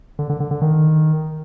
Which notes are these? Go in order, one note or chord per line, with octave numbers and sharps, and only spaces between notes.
D3
D3
D3
D3
D#3